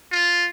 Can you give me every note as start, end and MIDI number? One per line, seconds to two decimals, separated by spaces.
0.12 0.46 65